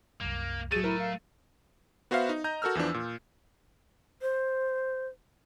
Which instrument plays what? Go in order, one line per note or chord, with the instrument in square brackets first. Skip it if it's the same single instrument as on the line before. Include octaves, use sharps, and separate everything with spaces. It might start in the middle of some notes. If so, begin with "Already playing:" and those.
[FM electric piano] C2 F#2 [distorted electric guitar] A#3
[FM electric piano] A2 F#3 [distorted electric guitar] A3 [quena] G#4 [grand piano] A6 D#7
[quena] E4 [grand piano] A#4
[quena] F5
[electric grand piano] B3 F#4 C5 E5 F5
D#4
D#5 A#5 G6
F#4 A4 A#4 E6 F6
E2 E3 F3 D4
A#2
[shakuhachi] C5